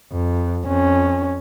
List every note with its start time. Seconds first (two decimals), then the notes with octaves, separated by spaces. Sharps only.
0.13 F2
0.67 F2 C#4